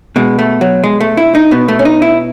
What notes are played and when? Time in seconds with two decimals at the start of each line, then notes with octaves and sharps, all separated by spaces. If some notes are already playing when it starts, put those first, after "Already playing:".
0.16 B2 G#3
0.39 A3
0.61 F#3
0.84 G#3
1.00 A3
1.17 E4
1.35 D#4
1.51 B2 B3
1.68 A3
1.79 C#4
1.85 D#4
2.02 E4